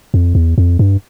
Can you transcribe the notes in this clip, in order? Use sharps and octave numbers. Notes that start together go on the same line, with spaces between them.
F2
E2
F2
G2